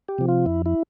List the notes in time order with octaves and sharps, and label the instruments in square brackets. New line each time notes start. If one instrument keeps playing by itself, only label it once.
[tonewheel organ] G4
C3 F3
F4
F2 E4
E4